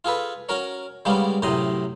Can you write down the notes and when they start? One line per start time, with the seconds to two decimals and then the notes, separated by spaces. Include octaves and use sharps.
0.05 F4 G#4 A4 B4
0.49 C#4 F#4 A#4 C#5
1.05 C#3 G3 G#3 A#3 B3 C#4
1.42 F#2 A2 C3 A#5 C6 D#6